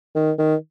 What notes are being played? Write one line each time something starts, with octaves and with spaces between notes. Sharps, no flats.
D#3
D#3